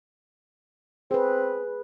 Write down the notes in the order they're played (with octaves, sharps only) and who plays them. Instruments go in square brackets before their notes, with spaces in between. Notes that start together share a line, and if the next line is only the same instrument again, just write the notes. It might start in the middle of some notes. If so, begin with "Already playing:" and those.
[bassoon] C4 [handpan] G#4 B4